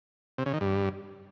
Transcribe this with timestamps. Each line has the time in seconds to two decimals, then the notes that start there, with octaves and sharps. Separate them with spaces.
0.38 C3
0.46 C#3
0.53 D#3
0.61 G2